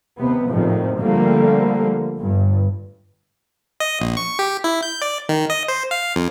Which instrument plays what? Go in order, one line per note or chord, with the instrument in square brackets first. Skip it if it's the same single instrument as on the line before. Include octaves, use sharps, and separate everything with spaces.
[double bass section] D#2 C3 B3
G#1 F2 A2 C3 D#3 F3
D3 F3 G3 A3 A#3
G1 G2
[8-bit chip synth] D#5
A#1
C#6
G4
E4
G6
D5
D#3
D#5
C5
F5
F2